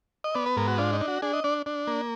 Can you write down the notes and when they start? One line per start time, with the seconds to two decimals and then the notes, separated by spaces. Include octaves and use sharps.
0.24 D#5
0.35 B3 D5
0.46 B4
0.57 G#2 A#4
0.68 F#4
0.78 D4 F4
0.93 D#4
1.01 D4
1.08 F#4
1.22 D4 G#4
1.33 D#5
1.44 D4 D5
1.66 D4
1.87 A#3